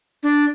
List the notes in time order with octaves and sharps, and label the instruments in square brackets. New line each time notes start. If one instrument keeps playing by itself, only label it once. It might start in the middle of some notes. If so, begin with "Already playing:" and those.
[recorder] D4